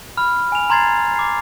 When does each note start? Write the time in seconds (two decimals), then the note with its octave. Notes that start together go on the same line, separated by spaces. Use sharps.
0.17 B5 F6
0.52 G#5 F7
0.70 A#5 C6 G#6 A6 C7
1.16 D6 C7